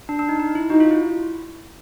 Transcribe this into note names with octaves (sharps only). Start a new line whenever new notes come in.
D4
D4
D#4
D#4
E4
D#4 F#4
F4
E4